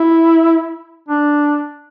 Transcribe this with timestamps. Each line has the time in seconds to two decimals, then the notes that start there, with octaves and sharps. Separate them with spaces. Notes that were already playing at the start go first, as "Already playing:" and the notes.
Already playing: E4
1.09 D4